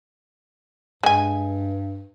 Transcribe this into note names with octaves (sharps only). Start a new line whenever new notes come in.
G2 G#3 G#5